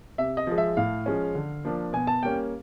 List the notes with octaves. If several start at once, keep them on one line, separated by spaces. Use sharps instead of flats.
C3 E5
D#5
F3 G#3
E5
A2 F5
F3 G#3 C#4
D3
F3 A#3 D4
B2 G#5
A5
G3 A#3 C#4 G5